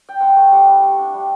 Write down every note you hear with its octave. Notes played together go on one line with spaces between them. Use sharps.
G5
C4 F#5
A3
G3 F#5
E4
A3
D4
G3